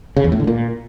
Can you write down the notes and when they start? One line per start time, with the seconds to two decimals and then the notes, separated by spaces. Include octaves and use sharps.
0.17 C#3
0.24 E2
0.32 A2
0.40 D3
0.47 A#2